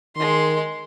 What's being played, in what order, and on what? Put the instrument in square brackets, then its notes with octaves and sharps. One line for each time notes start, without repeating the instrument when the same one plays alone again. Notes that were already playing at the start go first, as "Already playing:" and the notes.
[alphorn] D#3 [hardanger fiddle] G#3 C6